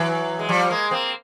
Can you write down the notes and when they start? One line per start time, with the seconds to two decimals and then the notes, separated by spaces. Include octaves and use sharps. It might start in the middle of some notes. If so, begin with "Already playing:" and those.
Already playing: E3 F#3
0.39 G#3
0.49 F3 G3
0.70 G#3 A#3
0.91 A#3 C4